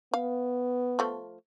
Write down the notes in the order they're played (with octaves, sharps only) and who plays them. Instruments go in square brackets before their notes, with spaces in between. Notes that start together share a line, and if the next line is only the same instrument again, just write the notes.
[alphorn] B3 [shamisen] F5
[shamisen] F3 A3